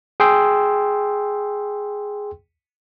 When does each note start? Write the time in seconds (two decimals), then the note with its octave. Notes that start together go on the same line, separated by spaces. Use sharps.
0.20 G#4 G5 C6 E6